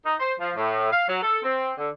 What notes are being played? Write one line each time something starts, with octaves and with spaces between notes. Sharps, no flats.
D#4
C5
F3
A2
F5
F#3
A4
C4
D3